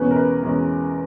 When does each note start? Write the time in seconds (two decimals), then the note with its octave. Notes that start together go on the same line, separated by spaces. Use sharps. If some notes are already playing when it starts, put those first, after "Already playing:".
Already playing: E2 B2 G#3 C#4 B4
0.11 A#4
0.16 B4
0.43 E2 B2 G#3 C#4